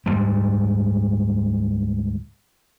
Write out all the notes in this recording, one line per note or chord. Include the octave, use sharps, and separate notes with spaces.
D2 G#2 G3